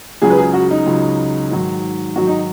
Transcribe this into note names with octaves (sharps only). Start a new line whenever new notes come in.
C#2 C#3 F#3 G#4
B4
G#4
F#4
D#4
C#2 C#3 F#3
G#2 D#3 F#3
G#2 D#3 F#3 F#4
D#4